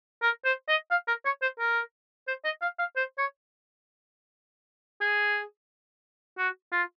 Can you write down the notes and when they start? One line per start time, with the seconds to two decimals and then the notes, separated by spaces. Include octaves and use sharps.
0.22 A#4
0.45 C5
0.68 D#5
0.91 F5
1.08 A#4
1.25 C#5
1.42 C5
1.59 A#4
2.28 C5
2.44 D#5
2.62 F5
2.79 F5
2.96 C5
3.18 C#5
5.01 G#4
6.38 F#4
6.72 F4